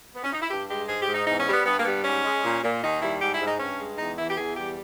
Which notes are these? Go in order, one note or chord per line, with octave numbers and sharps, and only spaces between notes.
B3
C#4
D#4
E4
G2 G4
G#3 G4
G#2 G#4
G4
G#2
D#4
E2 D#4
C#4
G3
B3
G2 B3
A#3
G3 B3
G#2 C#4
G#3
A#2
A#2
D#2 D#4
G3 E4
G#2 G4
E4
G#2
D#4
G2 C#4
G#3
E2 D#4
E3 E4
G4
E2 G#4
G3 G4